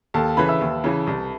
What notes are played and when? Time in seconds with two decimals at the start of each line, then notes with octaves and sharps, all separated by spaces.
0.14 D#2 A4 A5
0.37 C#3 E3 B4 B5
0.48 E5 E6
0.61 D#2
0.84 C#3 E3
1.07 C2